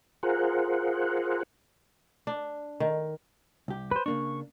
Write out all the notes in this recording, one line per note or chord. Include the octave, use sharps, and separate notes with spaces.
F4 G#4 A#4 C5 F#5
D4
D#3
C2 G4
B4 C5
C#3 A#3 D4 C#6